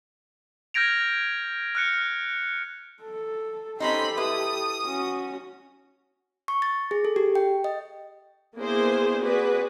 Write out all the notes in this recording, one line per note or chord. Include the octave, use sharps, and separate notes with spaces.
F6 G6 G#6 A#6 D7 F7
F6 F#6 C#7
A4
C4 C#4 D#4 G4 A4 B5 C6
E4 B4 D#6
C#4 F#4
C#6
A6
G#4
A4
G4
G5
D#5
A#3 B3 D4 E4 G#4 C5
C4 F#4 G#4 B4 D5